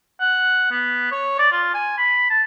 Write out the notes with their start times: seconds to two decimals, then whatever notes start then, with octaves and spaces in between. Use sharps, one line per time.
0.20 F#5
0.71 B3
1.12 C#5
1.39 D5
1.51 F4
1.74 G#5
1.98 B5
2.30 A5